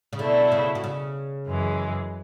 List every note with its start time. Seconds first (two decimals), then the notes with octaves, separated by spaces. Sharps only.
0.13 C#3
0.19 B2 D3 A3 E4
0.52 C#3
0.75 B2
0.84 C#3
1.47 F#2 E3 G#3